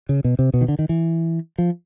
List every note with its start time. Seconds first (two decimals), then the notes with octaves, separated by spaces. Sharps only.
0.09 C#3
0.24 B2
0.39 C3
0.54 B2
0.61 D#3
0.68 D3
0.79 D#3
0.89 E3
1.58 F3